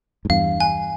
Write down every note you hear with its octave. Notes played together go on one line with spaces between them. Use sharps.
G#2
E2 G2 F5
G#5